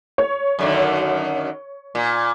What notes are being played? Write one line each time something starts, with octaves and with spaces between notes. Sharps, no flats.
C#5
F#2 D3 D#3
A#2